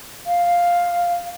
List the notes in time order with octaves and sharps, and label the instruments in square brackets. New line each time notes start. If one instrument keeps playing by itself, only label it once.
[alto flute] F5